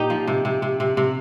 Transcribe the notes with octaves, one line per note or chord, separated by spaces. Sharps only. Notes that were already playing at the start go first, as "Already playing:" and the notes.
Already playing: A#2 D#4 G4
F3
C3
C3
C3
C3
C3